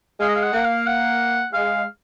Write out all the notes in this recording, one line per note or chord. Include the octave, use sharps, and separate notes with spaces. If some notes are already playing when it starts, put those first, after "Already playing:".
G#3 F5
D#5
F5
F#5
A#3 F#5
F5
F#5
G#3 F5